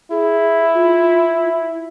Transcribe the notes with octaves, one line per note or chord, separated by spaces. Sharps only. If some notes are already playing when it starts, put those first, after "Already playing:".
E4 G#4
F4